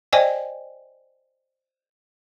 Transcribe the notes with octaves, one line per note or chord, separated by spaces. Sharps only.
C5 D5 D#5 G5 G#5